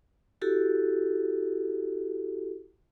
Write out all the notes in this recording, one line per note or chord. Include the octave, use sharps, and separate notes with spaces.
E4 F#4 G4 A4